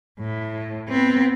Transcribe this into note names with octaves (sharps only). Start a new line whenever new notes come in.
A2
B3 C4